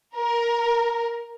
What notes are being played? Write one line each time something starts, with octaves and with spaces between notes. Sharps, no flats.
A#4